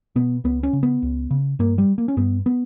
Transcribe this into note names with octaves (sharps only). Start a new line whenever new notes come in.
B2 B3
C#2 B3
C#4
C#3
B3
C#2
C#3
G2 A#3
G3
A#3
C#4
G2 B3
B3